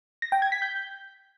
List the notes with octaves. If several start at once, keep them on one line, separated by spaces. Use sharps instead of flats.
A#6
G5
G#6
B6
G6